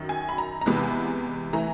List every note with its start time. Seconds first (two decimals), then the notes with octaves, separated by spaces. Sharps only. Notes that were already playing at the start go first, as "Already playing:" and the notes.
Already playing: F#2 D#3 F#3
0.09 G#5
0.29 B5
0.38 A#5
0.61 A#5
0.66 E2 C3 E3 G#3 B3 B5
1.53 E3 A3 A#5